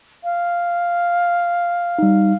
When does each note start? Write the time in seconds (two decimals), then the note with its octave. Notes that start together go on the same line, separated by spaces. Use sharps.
0.24 F5
1.99 G3 D#4